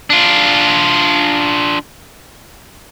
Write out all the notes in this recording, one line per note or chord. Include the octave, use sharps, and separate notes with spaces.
D4 F4